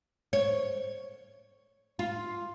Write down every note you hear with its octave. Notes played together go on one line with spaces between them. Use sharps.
C#5
F4